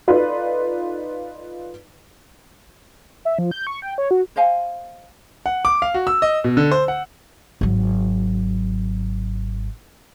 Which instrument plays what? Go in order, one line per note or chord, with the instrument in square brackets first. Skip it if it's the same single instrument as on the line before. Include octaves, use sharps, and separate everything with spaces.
[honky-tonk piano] D#4 F4 A4 B4 D5
[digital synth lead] E5
F3
G6
C#6
G5
C#5
F#4
[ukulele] C5 D#5 F5 G#5
[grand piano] F#5
D6
F5
F#4
E6
D#5
B2
D3
C5
F#5
[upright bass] G#1 F#3